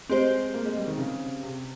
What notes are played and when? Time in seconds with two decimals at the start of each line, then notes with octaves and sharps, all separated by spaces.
0.10 G#3 C4 G4 C5
0.54 A#3
0.65 G#3
0.76 G3
0.87 D#3
0.98 C#3
1.43 C3